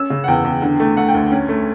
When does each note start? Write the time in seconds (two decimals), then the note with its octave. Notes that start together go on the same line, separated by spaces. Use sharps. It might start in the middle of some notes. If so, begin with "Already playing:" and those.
Already playing: C#4 E6
0.10 C#3
0.24 F#5
0.28 E2 G5
0.44 E2
0.62 D3
0.80 A3
0.97 A3 F#5
1.09 G5
1.15 D2
1.32 C#4
1.49 A3